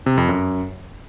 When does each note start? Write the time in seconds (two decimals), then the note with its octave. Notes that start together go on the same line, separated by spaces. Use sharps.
0.06 C3
0.18 F2
0.29 F#2